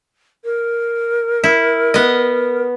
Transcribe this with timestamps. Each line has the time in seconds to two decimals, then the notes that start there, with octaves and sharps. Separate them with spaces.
0.44 A#4
1.44 E4
1.94 B3 D#5